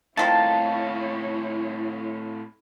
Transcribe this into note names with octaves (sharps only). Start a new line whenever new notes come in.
A2 D#3 F3 C4 E4 F4 C#5 A5